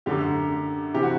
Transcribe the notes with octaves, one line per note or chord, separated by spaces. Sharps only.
F#2 D3 G4
C3 E3 G4
F#4